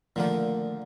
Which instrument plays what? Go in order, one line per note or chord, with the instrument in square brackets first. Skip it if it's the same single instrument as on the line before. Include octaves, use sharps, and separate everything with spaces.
[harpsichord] A#2 D3 A#3 [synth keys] D#3 F3 A3